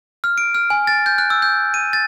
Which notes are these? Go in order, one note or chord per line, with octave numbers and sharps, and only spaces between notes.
F6
D7
F6
G#5
A6
G6
F#6
E6
G6
D#7
A6